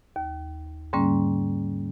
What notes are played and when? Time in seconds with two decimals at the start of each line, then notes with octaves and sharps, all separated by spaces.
0.16 D#2
0.93 G#2 D3 G3 A#3 C#4